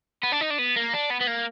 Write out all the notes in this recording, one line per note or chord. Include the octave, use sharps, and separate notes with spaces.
B3
D4
D#4
D4
B3
A#3
D4
B3
B3
A#3